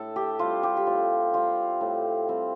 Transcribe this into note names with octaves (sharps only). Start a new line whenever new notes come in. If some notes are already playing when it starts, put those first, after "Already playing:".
Already playing: A2 A4
G4
G3 C4 F4
G4
G4
A2 F4
G3 C4 F4
A2
G3 C4